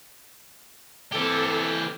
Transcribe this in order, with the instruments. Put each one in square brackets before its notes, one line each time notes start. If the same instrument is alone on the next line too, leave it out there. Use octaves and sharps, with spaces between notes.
[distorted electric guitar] E3 G4 [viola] C4 A4